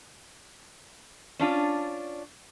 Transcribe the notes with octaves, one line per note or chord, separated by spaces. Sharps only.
C#4 D4 F4